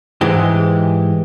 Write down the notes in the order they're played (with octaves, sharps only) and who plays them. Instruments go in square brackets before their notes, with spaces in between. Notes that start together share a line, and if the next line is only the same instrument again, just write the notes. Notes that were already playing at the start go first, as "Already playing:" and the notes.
[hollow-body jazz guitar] G#2 E3 G#3 G4